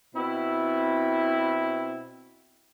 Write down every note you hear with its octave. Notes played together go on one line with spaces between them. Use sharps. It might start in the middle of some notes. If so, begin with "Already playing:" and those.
B2 C4 E4